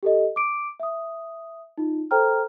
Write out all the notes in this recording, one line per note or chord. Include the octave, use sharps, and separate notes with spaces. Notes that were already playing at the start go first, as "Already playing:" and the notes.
G4 A4 D#5
D6 D7
E5 D#6
D#4 F4
A4 C5 G5 A#5 F6